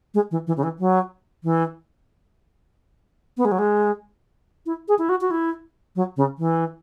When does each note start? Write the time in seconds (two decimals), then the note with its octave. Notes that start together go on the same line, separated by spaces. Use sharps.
0.14 G#3
0.31 E3
0.47 E3
0.57 C#3
0.63 E3
0.79 F#3
1.44 E3
3.37 B3
3.45 G#3
3.52 F#3
3.59 G#3
4.66 E4
4.88 G#4
4.99 E4
5.09 F#4
5.21 F#4
5.31 E4
5.96 F#3
6.17 C#3
6.38 E3